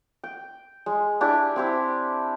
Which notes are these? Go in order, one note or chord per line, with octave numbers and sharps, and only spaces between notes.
G5
G#3
D4 E4 G4
C4 E4 G4